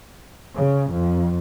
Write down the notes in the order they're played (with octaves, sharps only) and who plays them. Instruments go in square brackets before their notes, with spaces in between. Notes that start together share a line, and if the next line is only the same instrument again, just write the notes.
[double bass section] C#3
F2